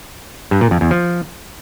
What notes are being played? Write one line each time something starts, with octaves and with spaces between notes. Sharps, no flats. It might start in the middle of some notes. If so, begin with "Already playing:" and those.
G2
A#2
F2
E2
F3